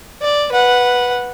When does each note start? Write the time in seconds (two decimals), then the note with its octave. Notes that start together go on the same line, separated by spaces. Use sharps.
0.22 D5
0.52 B4 F#5